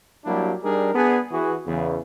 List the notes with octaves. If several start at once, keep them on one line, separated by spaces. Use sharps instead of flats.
F#3 G3 A#3 D4 E4 G4
G3 D4 D#4 G#4 A#4
B3 D4 G#4
E3 F#4 G#4
E2 C#3